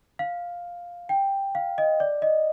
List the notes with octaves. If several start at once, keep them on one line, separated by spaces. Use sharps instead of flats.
F5
G5
F5
D#5
D5
D#5